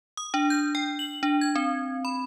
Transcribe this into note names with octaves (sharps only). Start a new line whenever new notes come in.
D#6
D4
G6
G5
F#7
D4
G#6
C4
B5